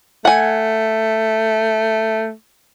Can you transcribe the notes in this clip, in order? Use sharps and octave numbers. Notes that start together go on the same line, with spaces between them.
A3 F#5 G#5